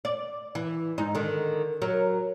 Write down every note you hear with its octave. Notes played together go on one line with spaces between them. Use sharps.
D5
E3
G#2 D#4
D3 D#3
F#3 A#4